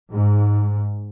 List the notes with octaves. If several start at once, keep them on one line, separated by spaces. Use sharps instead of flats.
G#2